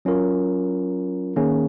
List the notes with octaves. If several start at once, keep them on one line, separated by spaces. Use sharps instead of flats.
F#3 C#4 F4 A#4
D#3 A#3 C#4 G#4